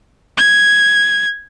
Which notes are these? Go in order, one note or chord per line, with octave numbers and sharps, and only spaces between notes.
G#6